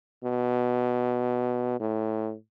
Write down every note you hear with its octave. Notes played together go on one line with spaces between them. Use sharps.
B2
A2